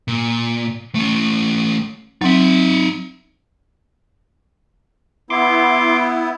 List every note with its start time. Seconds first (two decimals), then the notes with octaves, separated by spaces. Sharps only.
0.08 A#2
0.95 A3 C#4
2.21 F#3 C4 D#4 E5
5.30 B3 E4 C6 D6